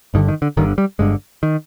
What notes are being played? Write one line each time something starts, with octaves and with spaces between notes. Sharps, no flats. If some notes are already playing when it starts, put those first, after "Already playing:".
G1 G2 D3 D#3
D#3
D3
G1 G2 D3 D#3
G3
G1 G2 D3 G#3
D#3